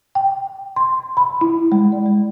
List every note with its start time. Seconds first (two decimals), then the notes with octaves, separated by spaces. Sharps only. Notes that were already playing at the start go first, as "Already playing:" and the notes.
0.15 G5
0.76 C6
1.17 B5
1.41 E4
1.72 G#3
1.92 D5
2.06 G#3